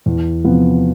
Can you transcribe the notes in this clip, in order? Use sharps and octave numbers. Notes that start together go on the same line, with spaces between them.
E2
C3 F3 B3